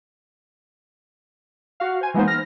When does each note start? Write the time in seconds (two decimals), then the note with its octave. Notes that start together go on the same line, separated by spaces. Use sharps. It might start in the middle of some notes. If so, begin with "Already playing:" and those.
1.80 F#4 F5
2.01 C5 G#5
2.14 E3 G#3 A#3 B3 D#4 C5
2.27 F6 A#6